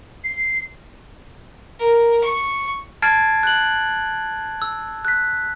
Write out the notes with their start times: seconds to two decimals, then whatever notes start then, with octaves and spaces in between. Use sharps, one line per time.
0.24 C7
1.80 A#4
2.23 C#6
3.02 A5 F6 G#6 A6 C7 D7
3.43 F#6 F#7
4.62 E6
5.05 F#6 B6